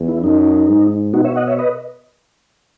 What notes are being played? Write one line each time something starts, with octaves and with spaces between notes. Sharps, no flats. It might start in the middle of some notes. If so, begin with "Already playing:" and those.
Already playing: E2
E4
F#2 D#4
G#2
B2 D#4 F#4
C#5 E5
D#5 F#5
C#5 E5
B4 D#5